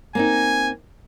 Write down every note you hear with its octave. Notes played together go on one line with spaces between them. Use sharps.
A#3 C4 D#4 G#5